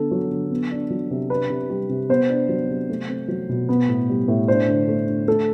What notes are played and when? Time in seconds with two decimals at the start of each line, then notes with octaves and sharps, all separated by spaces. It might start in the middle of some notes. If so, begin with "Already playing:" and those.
Already playing: D3 B3 A4
0.11 F#3
0.31 D3
0.51 B3
0.71 D4
0.90 F#3
1.10 C3
1.30 D4 B4
1.50 C3
1.70 G3
1.89 C3
2.09 B3 C5
2.30 D4
2.49 F#3
2.69 C3
2.89 A3
3.09 C4
3.28 F#3
3.49 B2
3.69 B3
3.88 A2
4.09 G3
4.28 A2
4.48 D4 C5
4.68 D3
4.88 A3
5.08 D3
5.28 A3 A4